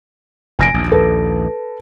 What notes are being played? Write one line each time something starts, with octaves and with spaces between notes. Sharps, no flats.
F1 A#2 G#5 A#6 D7
A#1 D#2
A4 B4